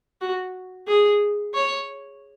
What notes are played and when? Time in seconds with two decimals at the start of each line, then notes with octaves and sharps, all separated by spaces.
0.21 F#4
0.88 G#4
1.55 C#5